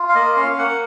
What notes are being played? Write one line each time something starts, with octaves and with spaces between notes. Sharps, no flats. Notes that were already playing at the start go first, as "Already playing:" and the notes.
Already playing: F4
F5
A#3 D#5
C#4 F5
F5
A#3 F#5